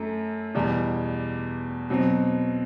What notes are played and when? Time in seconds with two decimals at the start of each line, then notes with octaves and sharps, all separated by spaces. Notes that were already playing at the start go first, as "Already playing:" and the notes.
Already playing: F#2 A3
0.55 E2 B2 G3
1.90 B2 F#3 C4